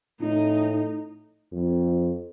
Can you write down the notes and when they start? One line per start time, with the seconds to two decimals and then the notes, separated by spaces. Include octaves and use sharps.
0.21 A2 D#4
1.53 F2